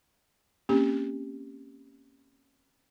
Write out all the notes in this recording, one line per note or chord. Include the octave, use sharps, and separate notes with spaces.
A#3 C4 C#4 G4